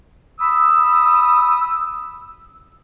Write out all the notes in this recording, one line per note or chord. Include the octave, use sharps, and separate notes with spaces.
B5 D#6 E6